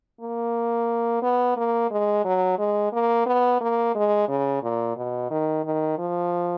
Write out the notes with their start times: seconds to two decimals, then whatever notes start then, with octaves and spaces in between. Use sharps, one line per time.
0.21 A#3
1.23 B3
1.57 A#3
1.91 G#3
2.25 F#3
2.59 G#3
2.93 A#3
3.26 B3
3.61 A#3
3.95 G#3
4.28 C#3
4.63 A#2
4.97 B2
5.31 D#3
5.64 D#3
5.99 F3